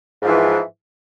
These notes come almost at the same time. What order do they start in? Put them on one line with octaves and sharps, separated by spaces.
G#2 F3 E3